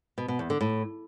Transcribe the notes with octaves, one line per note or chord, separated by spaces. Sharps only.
B2
B2
E2
D3
A2